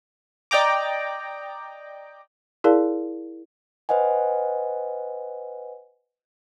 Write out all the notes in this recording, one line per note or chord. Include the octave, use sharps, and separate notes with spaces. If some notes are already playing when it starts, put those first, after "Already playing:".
D5 D#5 G5 A#5 D6
E4 G#4 A#4 D5 F5 A5
B4 C5 D#5 F#5 G#5